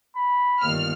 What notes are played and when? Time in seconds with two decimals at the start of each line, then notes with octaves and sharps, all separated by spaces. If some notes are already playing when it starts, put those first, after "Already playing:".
0.16 B5
0.62 G1 D#2 F6